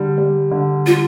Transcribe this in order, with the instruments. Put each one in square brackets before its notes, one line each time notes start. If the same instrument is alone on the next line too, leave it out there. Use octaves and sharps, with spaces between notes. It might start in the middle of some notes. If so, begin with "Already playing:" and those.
Already playing: [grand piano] D3 G3
G3
D3
[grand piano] G3 [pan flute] F4